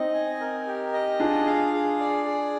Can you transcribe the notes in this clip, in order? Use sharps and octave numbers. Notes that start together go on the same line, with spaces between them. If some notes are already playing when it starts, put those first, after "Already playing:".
Already playing: C4 D#4 D#5
G#5
A#4
G4
D#5
D4 F4 G#4
F5
G#4
D5
G#4